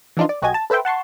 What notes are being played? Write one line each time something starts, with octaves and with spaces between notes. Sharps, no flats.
E3 F3 D4 D#4 F4
D5
B1 F#4 G4 D#5 G#5 G#6
A5
A4 B4 C5 E5 G5
F#5 A5 C6 C#6